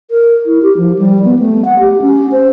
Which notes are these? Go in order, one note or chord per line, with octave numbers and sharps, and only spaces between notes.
A#4
E4
G4
F3
G3
B3
A3
F#5
G4
C#4
C5